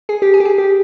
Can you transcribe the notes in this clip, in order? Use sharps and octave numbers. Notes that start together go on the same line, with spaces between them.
G#4
G4
G#4
G4
G#4
G4